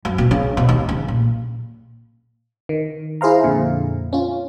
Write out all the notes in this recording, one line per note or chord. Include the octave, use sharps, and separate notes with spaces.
F#2
B2
C#3
B2
D#2
C#3
A#2
D#3
E4 G#4 C5 F5 A#5
F2 A#2 D3
C#4 F4